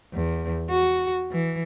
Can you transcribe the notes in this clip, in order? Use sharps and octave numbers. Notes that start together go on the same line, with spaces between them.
E2
F#4
E3